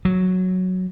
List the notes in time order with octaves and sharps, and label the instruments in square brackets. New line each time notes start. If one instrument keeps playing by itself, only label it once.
[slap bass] F#3